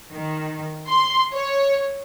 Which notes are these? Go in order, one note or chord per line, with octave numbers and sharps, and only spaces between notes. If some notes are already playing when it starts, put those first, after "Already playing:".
D#3
C6
C#5